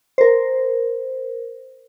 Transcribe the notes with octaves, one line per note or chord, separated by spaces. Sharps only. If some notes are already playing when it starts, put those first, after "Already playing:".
A#4 C5